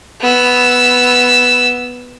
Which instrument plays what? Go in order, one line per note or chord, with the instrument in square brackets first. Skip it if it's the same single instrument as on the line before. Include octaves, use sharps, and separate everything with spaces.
[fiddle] B3 E6